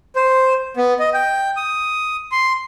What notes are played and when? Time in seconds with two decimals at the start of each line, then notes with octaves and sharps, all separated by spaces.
0.16 C5
0.77 B3
0.99 D#5
1.14 G5
1.57 D#6
2.32 C6